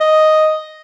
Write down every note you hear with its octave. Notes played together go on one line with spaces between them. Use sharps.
D#5